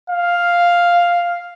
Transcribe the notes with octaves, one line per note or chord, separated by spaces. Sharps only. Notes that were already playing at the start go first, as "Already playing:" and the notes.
F5